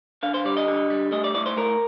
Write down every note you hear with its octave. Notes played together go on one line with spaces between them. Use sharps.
D3 F5
C5
G3 D5
D#5
D3
G3
A3 D#5
D5
A2 D5
C5
A2 A#4